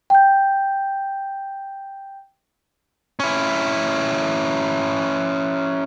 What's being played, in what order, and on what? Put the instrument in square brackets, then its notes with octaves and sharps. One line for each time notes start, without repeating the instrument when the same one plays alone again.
[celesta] G5 G6
[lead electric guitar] C#4 E4